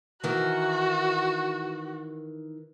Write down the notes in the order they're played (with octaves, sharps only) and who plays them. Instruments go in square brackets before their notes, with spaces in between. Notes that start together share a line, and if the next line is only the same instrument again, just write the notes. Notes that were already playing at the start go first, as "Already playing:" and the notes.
[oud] D#3 E3 [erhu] F#4